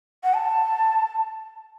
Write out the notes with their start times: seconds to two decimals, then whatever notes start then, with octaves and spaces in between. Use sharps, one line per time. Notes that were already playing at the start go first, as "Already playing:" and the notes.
0.24 F#5
0.34 A5